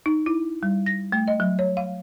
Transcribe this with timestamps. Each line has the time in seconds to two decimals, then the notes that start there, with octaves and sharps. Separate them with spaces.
0.06 D#4
0.26 E4
0.63 G3
0.86 A#6
1.12 A3
1.28 D#5
1.40 F#3
1.59 C#5
1.77 F5